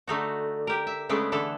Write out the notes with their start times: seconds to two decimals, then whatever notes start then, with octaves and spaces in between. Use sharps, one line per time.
0.07 D3 A3 D#4 F#4
0.67 G4 A#4
0.87 E5
1.09 C#3 G#3 A3 B3 D4
1.32 D3 E3 E4 A4